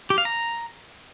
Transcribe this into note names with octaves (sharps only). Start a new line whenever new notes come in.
G4
F5
A#5